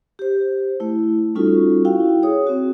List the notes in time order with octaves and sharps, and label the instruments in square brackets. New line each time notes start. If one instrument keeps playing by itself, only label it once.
[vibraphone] G4 C5
A3 E4
G3 C#4 D#4 F4 F#4 A4
E4 F#4 F5 G5
G#4 C#5 D#6
C4 F#4